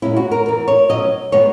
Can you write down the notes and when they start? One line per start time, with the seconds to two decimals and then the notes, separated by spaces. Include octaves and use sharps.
0.02 A#2 G#3 C#4 E4
0.16 F#4
0.31 A#4
0.46 E3 B3 A#4
0.68 C#5
0.89 B2 F#3 C#4 D#5
1.32 D#3 G#3 B3 C#5